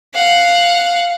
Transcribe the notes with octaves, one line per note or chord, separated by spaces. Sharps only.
F5 F#5